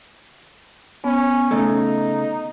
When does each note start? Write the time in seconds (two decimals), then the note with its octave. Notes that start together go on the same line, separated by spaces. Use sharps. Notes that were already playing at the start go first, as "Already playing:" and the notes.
1.04 B3 C#4
1.51 C#3 A3 D#4